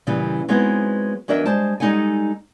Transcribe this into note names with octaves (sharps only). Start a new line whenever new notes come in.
F#2 A#2 C#3 E3 G3
F#3 G#3 B3 C4 D#4 E4
E2 F#3 D4 A#4 D#5 E5
G3 G#3 C5 A5
G3 G#3 D#4 A4 F#5 G#5